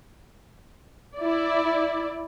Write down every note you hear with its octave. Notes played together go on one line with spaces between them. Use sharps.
E4 D5